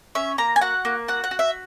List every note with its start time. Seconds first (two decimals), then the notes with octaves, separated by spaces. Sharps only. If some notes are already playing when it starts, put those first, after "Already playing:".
0.15 C#4 E5
0.38 A#3 A#5
0.56 G#5
0.61 F#4 F#5
0.85 A#3
1.08 F#4 F#5
1.24 F#5
1.31 F#4
1.39 E5